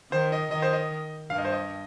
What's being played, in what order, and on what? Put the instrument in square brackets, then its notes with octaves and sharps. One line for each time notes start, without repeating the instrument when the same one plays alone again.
[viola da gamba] D#3 [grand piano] C5
[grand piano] D#5
[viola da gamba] D#3 [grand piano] D#5
[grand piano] C5
D#5
[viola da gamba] G2 [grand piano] F5
[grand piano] D#5
C5
D#5